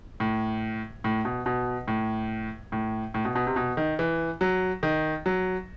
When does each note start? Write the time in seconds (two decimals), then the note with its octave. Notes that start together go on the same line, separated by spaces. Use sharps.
0.20 A2
1.04 A2
1.25 B2
1.46 B2
1.88 A2
2.72 A2
3.14 A2
3.25 B2
3.35 B2
3.47 C3
3.56 B2
3.77 D#3
3.99 E3
4.41 F#3
4.83 D#3
5.26 F#3